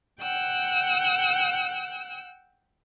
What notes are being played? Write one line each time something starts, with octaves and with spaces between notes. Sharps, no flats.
F#5 G5 E6 F#6